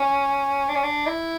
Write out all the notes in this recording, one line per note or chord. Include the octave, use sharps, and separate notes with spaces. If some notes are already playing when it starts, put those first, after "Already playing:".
Already playing: C#4
D4
C#4
D4
E4